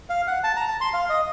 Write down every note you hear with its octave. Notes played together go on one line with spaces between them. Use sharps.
F5
F#5
A5
A#5
A5
C6
F5
D#5